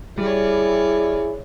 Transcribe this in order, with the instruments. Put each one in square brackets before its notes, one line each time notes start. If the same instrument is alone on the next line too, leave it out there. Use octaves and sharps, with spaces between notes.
[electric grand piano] G3 [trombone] E4 [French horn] G#4 [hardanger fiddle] C#5 D5